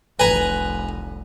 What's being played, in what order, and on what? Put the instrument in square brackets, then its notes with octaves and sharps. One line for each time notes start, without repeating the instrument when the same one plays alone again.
[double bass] F1 C2 [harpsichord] B4 G#5 A#5